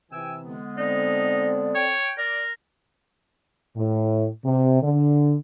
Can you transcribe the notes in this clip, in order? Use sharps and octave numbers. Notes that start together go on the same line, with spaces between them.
C3 E3 G5 G#5 E6
D3 G#3 B3
C4 D#4 A4 D5
C#5 G5
A#4 D5
A2
C3
D3